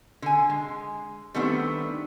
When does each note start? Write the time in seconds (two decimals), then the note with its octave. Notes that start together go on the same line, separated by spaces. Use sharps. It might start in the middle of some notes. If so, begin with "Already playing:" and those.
0.22 D3 G#5
0.50 G#3
1.35 D#3 G3 A3 B3 C4 D4